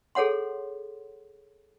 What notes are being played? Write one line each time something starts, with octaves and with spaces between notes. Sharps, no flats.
G#4 A4 C#5 F#5 C6